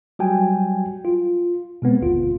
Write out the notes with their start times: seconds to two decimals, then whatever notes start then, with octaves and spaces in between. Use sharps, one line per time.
0.19 F#3 G3 F#4 G5 G#5
1.05 F4
1.82 B2 G#3 B3 C4
2.01 G1 D#2 F4